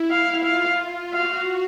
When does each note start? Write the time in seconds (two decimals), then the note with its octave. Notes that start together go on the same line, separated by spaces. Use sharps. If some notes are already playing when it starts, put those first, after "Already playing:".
Already playing: E4
0.10 F5
0.44 F4 F5
1.12 F#4 F5